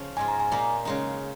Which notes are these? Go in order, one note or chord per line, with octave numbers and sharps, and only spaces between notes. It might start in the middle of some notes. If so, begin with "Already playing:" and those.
Already playing: C#3 F3 C#4
G#2 G#3 F4 G#5
A#5
G#5
A#2 A#3 D#4
C#3 G#3 D#4